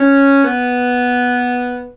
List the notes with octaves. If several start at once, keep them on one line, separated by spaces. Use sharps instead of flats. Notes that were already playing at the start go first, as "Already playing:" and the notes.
Already playing: C#4
B3